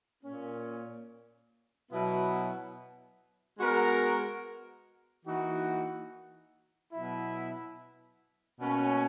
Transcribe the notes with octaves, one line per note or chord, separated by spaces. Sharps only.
A#2 A#3 C#4
B2 F#3 B3 E4
G#3 B3 F#4 A#4
E3 A#3 D#4 F#4
B2 F#3 B3 E4
B2 A#3 C#4